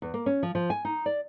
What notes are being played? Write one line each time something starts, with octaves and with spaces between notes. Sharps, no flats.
E2
A#3
C#4
F3
F3
G#5
D#4
D5